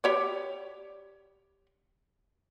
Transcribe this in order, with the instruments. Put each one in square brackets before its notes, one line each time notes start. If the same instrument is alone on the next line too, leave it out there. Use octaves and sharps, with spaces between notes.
[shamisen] G4 C#5 D5